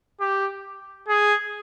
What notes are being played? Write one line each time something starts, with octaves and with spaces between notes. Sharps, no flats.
G4
G#4